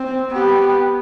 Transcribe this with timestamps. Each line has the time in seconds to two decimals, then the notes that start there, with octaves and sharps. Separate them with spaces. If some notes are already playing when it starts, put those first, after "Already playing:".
Already playing: C4
0.33 B3 G4